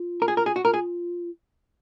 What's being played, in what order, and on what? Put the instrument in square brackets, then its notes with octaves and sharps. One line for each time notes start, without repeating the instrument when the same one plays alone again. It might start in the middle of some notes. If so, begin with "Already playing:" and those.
Already playing: [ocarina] F4
[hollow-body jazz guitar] A#4
G#4
A#4
G#4
F#4
[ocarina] F4 [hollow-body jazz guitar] A#4
[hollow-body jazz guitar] G#4